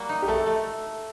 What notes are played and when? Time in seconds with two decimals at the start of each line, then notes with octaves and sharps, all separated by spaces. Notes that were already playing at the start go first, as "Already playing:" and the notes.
Already playing: G3 A#3 F#4
0.09 D#4
0.22 G4
0.28 A3 A4
0.46 A3